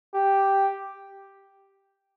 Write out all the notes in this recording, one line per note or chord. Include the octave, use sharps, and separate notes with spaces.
G4